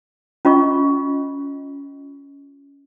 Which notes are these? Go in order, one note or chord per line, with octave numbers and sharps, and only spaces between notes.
C#4 F4 D#5 C#6